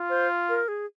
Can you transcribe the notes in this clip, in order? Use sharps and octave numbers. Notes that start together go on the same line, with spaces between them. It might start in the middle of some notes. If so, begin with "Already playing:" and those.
Already playing: F4
C5
A#4
G#4